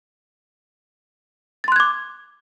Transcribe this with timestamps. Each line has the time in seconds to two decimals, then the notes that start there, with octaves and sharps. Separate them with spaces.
1.64 A6
1.68 C6
1.72 F#6
1.76 G#6
1.80 D6